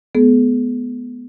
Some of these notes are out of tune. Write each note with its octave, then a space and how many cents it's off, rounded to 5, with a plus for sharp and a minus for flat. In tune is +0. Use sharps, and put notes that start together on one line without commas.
G#3 +40 B3 +0 G#4 +45